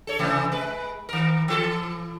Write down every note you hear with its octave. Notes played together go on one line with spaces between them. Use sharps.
A4 C#5
C3 E3 A3
G#3 B4
D#3 A#4
E3 A4